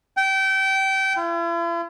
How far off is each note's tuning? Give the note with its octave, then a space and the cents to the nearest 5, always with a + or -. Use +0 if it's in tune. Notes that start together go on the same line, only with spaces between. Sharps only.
G5 -25
E4 +45